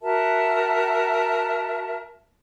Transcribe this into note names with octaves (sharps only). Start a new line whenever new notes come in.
F#4 A#4 E5 A5